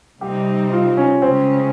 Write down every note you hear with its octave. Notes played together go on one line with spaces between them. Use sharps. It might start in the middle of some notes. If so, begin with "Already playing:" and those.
C3 G3 C4 D#4 G4
F4
C#4
C#3 G#3 C4 C#4